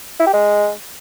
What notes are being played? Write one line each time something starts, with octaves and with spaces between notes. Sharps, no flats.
E4
G4
G#3